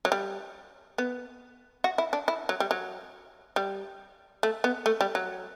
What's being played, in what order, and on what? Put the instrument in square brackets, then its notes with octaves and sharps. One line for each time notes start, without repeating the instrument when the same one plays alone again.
[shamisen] F#3
G3
B3
F#4
E4
D4
E4
F#3
G3
F#3
G3
A3
B3
A3
G3
F#3